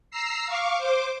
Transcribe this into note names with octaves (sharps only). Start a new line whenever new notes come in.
A#5 E6 C7
F5 C#6 D6
C5 D6